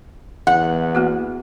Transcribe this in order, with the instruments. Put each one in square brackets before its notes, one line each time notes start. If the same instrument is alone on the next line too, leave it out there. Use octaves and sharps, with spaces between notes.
[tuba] E2 [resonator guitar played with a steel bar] F#5
[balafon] A#3 B3 F#4